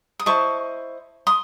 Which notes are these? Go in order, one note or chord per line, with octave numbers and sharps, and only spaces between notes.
D#6
E4 C5 D#5 A5 C#6
C6 D#6